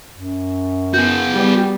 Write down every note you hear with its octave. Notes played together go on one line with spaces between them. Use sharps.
F#2
B3 F#4 G#4 G6
G3 B3